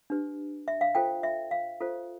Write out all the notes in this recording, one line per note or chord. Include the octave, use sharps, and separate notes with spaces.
D4 G4 B4
E5
F5
F4 A4 C5 G5
E5
F5
F4 A4 C5